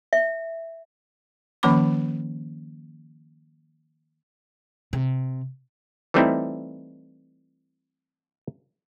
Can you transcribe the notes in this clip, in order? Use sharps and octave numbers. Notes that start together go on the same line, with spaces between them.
E5
D#3 F3 A#3 C#4 B5 D6
C3
E3 G3 A3 C4 D#4 E4